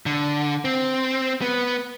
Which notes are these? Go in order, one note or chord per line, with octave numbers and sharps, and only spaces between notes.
D3
C4
B3